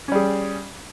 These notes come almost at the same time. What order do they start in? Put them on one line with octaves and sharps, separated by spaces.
C#4 G3 G#4